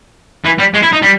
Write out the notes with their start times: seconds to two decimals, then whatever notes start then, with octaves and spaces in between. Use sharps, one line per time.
0.45 E3
0.59 G3
0.74 G#3
0.83 E4
0.92 D#4
1.02 G3